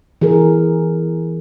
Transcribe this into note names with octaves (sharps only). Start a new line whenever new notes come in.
E3 G#4 A#4